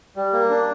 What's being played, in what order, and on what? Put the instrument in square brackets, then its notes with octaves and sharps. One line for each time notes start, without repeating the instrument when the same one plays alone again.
[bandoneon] G3
A#3
D4